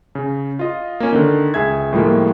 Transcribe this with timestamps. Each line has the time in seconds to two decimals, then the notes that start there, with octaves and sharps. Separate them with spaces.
0.15 C#3
0.59 F4 D#5
1.00 A#3 C#4
1.13 D3 D#3
1.54 C#2 G#4 E5 G#6
1.93 A2 D#3 F3 G3 G#3 A#3